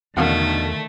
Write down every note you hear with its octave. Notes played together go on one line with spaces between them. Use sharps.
E2 B2 D3 D#3 A3 F5 F#5